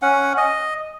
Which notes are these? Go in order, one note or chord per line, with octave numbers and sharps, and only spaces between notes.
C#4 F#5
D#5